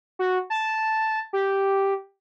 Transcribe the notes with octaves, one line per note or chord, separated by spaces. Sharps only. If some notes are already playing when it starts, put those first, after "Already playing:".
F#4
A5
G4